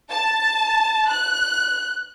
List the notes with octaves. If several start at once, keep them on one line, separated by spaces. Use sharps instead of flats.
A5
F#6